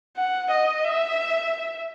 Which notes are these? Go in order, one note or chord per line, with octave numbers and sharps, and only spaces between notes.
F#5
D#5
E5